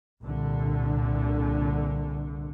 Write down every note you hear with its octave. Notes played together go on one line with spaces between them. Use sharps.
C2 A#2 D3